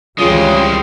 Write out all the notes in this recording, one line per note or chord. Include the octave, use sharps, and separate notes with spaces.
C#2 C#3 E3 G3 G#3 C4 F4